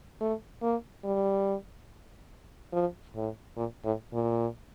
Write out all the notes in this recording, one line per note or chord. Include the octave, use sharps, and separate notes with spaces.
A3
A#3
G3
F3
A2
A#2
A2
A#2